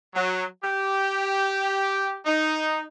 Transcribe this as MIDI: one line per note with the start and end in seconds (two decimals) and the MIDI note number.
0.14 0.44 54
0.63 2.17 67
2.25 2.82 63